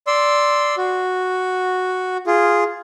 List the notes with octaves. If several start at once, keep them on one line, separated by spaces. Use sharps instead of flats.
D5 C6 E6
F#4
F4 G#4